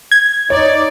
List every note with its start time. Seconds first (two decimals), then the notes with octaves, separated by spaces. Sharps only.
0.11 G#6
0.50 D#4 C#5 D5